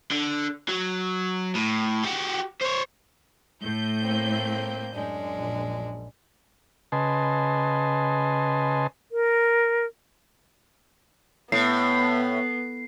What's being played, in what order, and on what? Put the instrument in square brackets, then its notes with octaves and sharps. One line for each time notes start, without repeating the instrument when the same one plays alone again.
[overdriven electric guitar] D3
F#3
A2
F#4 G4
C5 C#5
[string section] A2 G6
[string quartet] A#3 C4
F#2 G#3 D4
[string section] A#1
[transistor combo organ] C#3 B4 D#5 G#5 A5 C6
[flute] A#4
[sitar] A2 [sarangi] B3 [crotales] C7